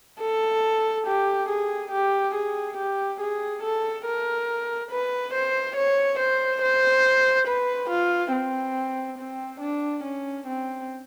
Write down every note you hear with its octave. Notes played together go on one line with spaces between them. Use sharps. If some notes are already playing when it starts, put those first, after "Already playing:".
A4
G4
G#4
G4
G#4
G4
G#4
A4
A#4
B4
C5
C#5
C5
C5
B4
F4
C4
C4
D4
C#4
C4